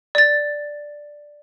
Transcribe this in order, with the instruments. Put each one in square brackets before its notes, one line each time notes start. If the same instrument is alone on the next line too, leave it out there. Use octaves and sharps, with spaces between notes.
[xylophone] D5 A6